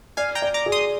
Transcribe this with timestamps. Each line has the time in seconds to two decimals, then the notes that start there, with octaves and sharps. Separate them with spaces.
0.17 D5 F5 G#5
0.35 G5 A#5
0.42 D5
0.54 A#5 D6
0.66 G#4
0.72 C6 D#6